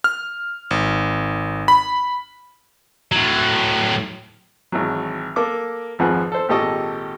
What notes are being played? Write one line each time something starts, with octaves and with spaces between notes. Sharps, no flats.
F6
G#1
B5
A2 F#3
G#1 E3 F#3
A#3 A4 D6
G#1 F2 F3 G#4 B4 F#5
A4 C5
G#1 A#2 G4 A4 D#5 C#6